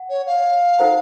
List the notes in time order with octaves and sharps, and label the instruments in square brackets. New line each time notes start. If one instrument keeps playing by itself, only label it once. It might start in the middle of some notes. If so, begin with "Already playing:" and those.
Already playing: [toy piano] F#5
[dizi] C#5
F5
[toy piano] D#4 A4 C5 F#5 A#5